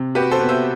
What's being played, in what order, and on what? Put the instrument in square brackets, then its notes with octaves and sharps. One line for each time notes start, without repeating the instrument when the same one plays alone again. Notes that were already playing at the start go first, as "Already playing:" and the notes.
Already playing: [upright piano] C3
[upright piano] F#4 [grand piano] G4 B4
[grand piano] A4 C5
[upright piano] B3
[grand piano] C5 E5